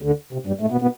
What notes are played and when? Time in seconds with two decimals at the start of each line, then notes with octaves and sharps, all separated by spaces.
0.02 D2 D3
0.33 C3
0.46 G2 G3
0.61 A2 A3
0.72 B2 B3
0.82 B2 B3